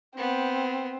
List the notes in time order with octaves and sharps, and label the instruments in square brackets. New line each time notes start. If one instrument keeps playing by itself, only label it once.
[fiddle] B3 [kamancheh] C4